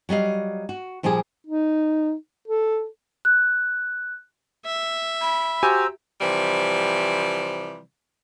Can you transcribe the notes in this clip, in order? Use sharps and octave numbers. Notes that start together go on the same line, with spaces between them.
F#3 G3 D#5 F5
F#4
A#2 F3 G3 G4 G#4
D#4
A4
F#6
E5
B5
F#4 G4 C5 G#5 A#5 E6
C3 E3 F3 G3